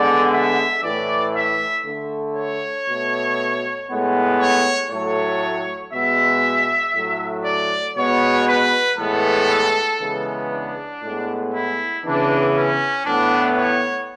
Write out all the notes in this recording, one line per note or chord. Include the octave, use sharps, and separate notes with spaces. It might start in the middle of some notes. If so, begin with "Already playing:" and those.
Already playing: D3 G#3 B3 D5
E5
A2 E3 A3 D5
E5
D3 A3
C#5
B2 A3
A2 G#3 B3
C#5
A2 F#3 A3 C#5
B2 G#3 B3 E5
A2 F#3 A3
D5
B2 G#3 B3 C#5
B4
A2 E3 G#3 B3 A4
C#3 E3 G#3 B3
D4
A2 G#3 B3
E4
C#3 E3 B3 D4
C#4
A2 E3 B3 D4
C#5